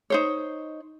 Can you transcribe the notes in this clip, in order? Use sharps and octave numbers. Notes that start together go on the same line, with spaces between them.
D#4 C5 C#5